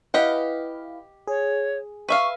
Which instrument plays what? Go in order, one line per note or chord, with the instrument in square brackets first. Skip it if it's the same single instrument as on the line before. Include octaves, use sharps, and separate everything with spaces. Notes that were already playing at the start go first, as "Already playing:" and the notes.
[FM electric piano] E4 B4 F5 [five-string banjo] G4 D#5 F#5
[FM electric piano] G#4 [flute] C#5
[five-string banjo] B4 E5 F5 [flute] C#6